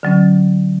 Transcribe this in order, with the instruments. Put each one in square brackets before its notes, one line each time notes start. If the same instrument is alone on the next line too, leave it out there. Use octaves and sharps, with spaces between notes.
[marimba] D3 F#3 C#4